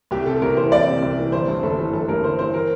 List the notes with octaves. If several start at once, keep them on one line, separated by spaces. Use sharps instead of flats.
C2 G4
C3 A4
A4
C2 A#4
E3 C5
C2 D5
C3
C2
E3
G1 C5
G2
G1 A4
E3
G1 A4
G2 A#4
G1 C5
E3 C5
A#4